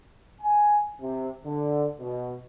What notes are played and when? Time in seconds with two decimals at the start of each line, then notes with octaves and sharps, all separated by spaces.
0.42 G#5
1.01 C3
1.45 D3
2.00 B2